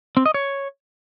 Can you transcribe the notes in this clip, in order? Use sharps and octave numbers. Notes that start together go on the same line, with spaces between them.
C4
D#5
C#5